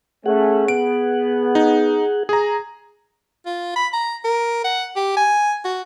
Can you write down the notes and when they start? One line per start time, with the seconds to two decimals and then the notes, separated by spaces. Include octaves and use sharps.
0.26 A3 C#4 G#4 F#5
0.68 B3 D7
1.55 D#4
2.29 G#4 A#5
3.46 F4
3.76 B5
3.93 A#5
4.24 A#4
4.64 F#5
4.96 G4
5.17 G#5
5.65 F#4